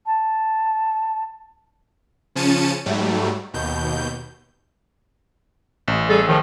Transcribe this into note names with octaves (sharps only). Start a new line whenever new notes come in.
A5
C#3 F3 C#4 A5 C#7 D#7
G#2 F#3 G3 A3
D#2 B2 G6
A1
G3 G#4 A4
A2 D#3 F3